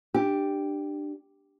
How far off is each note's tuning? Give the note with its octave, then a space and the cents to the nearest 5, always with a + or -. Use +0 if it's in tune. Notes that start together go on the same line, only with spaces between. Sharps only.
D4 +20 G4 +0